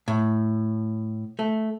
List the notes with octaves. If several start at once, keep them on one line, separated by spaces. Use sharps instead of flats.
A2
A3